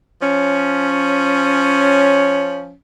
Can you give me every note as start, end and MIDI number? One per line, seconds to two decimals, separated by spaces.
0.22 2.74 53
0.22 2.74 61